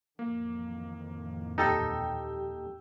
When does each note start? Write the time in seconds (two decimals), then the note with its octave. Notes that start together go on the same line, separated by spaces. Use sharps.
0.19 A1 F2 D#3 A#3
1.58 D#2 A#2 D#4 G4 A4 G5 E6